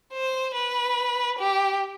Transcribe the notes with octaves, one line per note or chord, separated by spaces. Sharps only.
C5
B4
G4